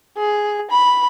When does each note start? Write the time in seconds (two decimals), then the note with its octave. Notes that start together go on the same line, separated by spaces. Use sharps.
0.17 G#4
0.71 B5